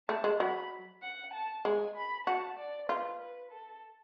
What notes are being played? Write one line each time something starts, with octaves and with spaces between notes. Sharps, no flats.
A3 A5
G#3
F#3 B5
F#5
A5
G#3 G#5
B5
F#4 A5
D5
F4 B4
B4
A4